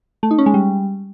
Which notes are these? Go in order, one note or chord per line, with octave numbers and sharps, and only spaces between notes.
A3
D#4
C#4
G#3
G3